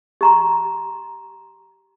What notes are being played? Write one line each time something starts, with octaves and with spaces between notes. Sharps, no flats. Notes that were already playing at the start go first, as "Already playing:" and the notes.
G4 A#5 C6